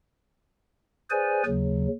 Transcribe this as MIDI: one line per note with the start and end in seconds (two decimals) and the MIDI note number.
1.11 1.43 68
1.11 1.43 71
1.11 1.43 72
1.11 1.43 74
1.11 1.43 80
1.46 1.88 39
1.46 1.88 49
1.46 1.88 54